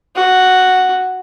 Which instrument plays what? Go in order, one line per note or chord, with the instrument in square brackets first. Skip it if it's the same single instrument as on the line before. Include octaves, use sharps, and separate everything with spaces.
[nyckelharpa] F#4